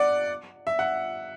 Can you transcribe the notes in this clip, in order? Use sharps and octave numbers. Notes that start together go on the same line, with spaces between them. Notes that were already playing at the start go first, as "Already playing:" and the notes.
Already playing: D5 F#5
E5
F#5